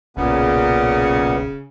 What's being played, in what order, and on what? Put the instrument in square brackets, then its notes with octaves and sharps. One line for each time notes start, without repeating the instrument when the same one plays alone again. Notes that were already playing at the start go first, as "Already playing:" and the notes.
[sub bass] D1 [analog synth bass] B1 [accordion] A#2 B3 [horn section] C#3